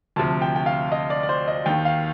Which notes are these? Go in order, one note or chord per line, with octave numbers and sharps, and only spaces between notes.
D2 C3 F3 A5
G5
G5
F5
D#5
D5
D5
C5
D#5
D#2 D#3 G5
F5